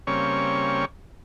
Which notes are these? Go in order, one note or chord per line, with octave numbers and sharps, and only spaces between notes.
C#3 G3 A#3 C4 C#4 C#6